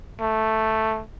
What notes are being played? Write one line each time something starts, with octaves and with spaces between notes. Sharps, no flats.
A3